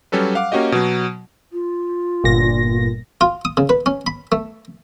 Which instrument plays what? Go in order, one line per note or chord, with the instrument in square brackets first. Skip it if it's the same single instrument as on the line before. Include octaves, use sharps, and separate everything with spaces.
[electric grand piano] F#3 G3 C#4 A4 B4
F5 F#5 D6
A#3 C#4 F#4 G4 D#5
B2 F#3
[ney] F4
[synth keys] G1 A#2 A#6
[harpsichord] F4
D#6
C#3
B4
C#4
B5
A3